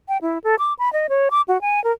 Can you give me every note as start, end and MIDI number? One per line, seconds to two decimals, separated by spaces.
0.09 0.18 79
0.22 0.38 64
0.44 0.55 69
0.59 0.73 86
0.79 0.92 83
0.93 1.07 75
1.09 1.29 73
1.31 1.41 86
1.48 1.60 66
1.61 1.82 80
1.84 1.92 70